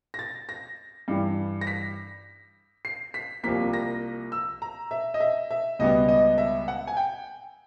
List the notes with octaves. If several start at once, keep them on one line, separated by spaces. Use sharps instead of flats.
A#6
A6
A#6
G2 E3 G3
A#6
B6
C7
B6
C2 C3 F3 A#3 B6
A#6
E6
A#5
E5
D#5
E5
E5
C#2 B2 G3 B3 D#5
D#5
E5
F#5
G#5
G5